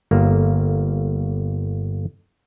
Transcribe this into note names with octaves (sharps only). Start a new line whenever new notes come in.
G1 A#3